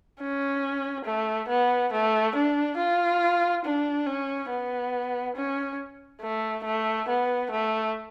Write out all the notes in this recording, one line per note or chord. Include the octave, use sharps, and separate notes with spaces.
C#4
A3
B3
A3
D4
F4
D4
C#4
B3
C#4
A3
A3
B3
A3